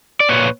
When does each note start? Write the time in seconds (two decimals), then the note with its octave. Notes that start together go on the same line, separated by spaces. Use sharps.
0.20 D5
0.29 A#2 B4 C#5